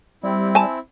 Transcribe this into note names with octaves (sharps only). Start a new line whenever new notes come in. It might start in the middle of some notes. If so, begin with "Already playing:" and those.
G3 C4 E4
G#5 A5